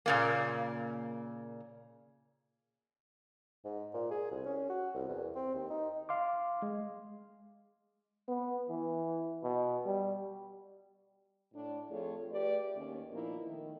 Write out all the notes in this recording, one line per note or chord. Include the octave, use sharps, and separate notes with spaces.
A#2 C#3 A#3
G#2
A#2
G#4
C2
C#4
F#4
C2
E2
C4
D#2
D#4
F5 C6 D6
G#3
B3
E3
B2
G3
A2 D4
F2 A3 F4 G#4 A4 C#5
A3 G4 G#4 B4 D5
D#2 C#4
A#2 F3 A#3 B3 D#4 E4
D#3 A3